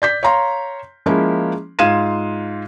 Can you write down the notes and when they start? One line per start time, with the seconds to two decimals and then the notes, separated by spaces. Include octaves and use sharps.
0.02 D5 G6 B6
0.23 C#5 F5 A#5 C6
1.06 F3 G#3 A#3 C#4 E4
1.79 G#2 F4 F5 G#6 D#7 E7